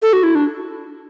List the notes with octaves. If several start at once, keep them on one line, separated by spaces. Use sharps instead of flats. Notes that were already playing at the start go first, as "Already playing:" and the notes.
A4
F#4
E4
D4